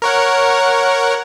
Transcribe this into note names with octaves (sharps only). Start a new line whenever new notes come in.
A#4 C#5 F#5